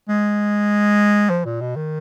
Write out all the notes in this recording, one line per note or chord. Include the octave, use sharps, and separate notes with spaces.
G#3
F3
A#2
B2
D#3